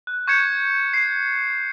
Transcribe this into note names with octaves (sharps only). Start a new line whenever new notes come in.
F#6
C#6 G6 G#6 C#7 E7
C7